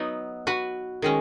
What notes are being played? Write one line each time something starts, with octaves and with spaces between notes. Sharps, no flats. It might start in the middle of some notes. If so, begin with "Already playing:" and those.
Already playing: F#3 B3 D#4
F#4 B4
D#3 G#3 C#4